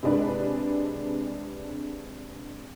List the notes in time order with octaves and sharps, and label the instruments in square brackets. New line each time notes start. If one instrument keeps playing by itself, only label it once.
[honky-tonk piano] C3 G#3 D4 B4